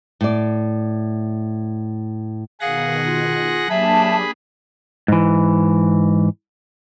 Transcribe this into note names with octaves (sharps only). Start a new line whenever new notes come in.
A2 D5
B2 D#3 G#4 F5 F#5 A#6
F4
F#3 A#3 D4 G4 G#4 E5 A5 B5
G#2 E3